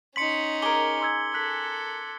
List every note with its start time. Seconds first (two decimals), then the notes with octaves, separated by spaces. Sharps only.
0.16 C#4 D#4 C6 B6 C#7 F#7
0.62 G#4 A#4 D6 G7
1.01 C6 E6 G#6
1.34 A4 F#6 B6 F#7